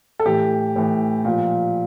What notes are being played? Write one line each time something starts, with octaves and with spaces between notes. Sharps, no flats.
A4
A2 E3 G4
A2 E3
A#2 F3